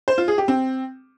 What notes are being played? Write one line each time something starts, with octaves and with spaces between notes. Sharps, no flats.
C5
F4
G#4
G4
C4